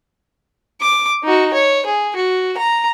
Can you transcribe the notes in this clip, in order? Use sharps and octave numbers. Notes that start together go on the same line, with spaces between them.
D6
D#4 F#4
C#5
G#4
F#4
A#5